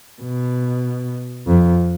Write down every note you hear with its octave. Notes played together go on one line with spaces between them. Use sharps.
B2
F2